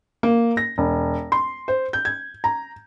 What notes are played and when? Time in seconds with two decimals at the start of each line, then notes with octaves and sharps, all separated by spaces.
0.23 A#3
0.57 A#6
0.78 E1
1.32 C6
1.68 C5
1.93 G6
2.05 G#6
2.44 A#5